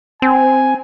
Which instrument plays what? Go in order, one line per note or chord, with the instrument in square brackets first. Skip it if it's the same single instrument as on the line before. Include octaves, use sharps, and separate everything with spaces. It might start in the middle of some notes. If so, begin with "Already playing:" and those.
[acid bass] C4 [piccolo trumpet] G#5